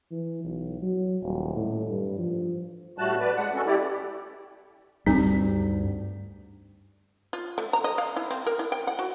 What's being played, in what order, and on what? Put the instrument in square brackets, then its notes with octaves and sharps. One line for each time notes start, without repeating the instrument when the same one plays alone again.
[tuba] E3
B1
F#3
D#1
A2
G2
F3
[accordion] A2 G3 A3 F#4 A5 F#6
B4 D5
G#3 F#5
C#4 F#4 A4
E4 G4 D5
[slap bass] D2 G2 G3 [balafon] C4 D#4
[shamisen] F4
A3
A#5
D#5
F5
E4
C4
A#4
E4
G5
F#5
F#4